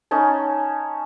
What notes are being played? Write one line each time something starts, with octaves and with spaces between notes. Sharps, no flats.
C#4 D#4 C#5 A5